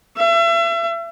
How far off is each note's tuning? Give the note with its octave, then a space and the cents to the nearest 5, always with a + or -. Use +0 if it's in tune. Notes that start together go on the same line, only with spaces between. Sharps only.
E5 +35